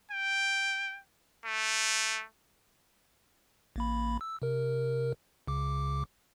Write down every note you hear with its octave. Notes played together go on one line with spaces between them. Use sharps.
G5
A3
A1 A#3 B5
E6
C3 A#4
C#2 C#3 D6